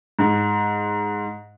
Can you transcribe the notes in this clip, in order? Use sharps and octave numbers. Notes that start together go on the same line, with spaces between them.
G#2